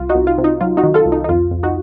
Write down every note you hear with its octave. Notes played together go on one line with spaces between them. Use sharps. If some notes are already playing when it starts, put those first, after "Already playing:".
Already playing: C2 F4
D#4 F#4
C2
F4
C3
D#4
F#3 F4
D#4 F#4
D#3
F4 A4
C2
D#4
D#4
F2 F4
F2
D#4 F#4